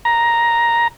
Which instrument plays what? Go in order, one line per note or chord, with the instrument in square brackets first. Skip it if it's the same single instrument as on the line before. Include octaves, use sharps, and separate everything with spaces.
[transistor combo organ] A#5